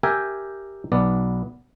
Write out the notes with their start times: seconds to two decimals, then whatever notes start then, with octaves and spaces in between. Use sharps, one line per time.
0.03 G4 A#4 E5 G5 G#5
0.92 B1 B3 D5